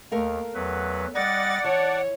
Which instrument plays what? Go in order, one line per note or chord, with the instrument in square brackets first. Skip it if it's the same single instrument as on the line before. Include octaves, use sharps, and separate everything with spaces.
[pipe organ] D#2 [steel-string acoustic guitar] A3 A#4 F5
[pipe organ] E2 F#3 B4
[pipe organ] G3 D#5 A#6 [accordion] D5 F#5 [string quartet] A6
[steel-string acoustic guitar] E3 [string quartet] C#5 [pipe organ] A5 C#6 D6